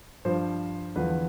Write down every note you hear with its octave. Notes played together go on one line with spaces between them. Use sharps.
G2 F3 C5
E2 D3 F3 B4